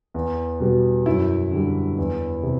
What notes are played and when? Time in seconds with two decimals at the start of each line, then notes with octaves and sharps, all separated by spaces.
0.14 E2
0.60 B2 G3 B3
1.06 F#2 E4
1.52 D3 G3
1.98 E2
2.43 C3